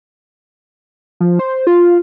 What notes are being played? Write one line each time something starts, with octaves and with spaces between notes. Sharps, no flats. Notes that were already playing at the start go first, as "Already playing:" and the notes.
F3
C5
F4